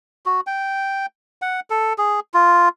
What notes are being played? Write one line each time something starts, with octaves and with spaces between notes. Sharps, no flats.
F#4
G5
F#5
A4
G#4
F4